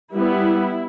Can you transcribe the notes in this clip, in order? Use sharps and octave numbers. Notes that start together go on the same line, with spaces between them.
G3 B3 E4